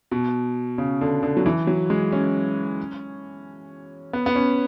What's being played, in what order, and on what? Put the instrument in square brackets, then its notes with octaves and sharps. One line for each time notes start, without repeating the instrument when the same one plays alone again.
[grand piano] B2
C#3
D3
D3
F#3
E3
F#3
G#3
C#4
B3
B3
C#4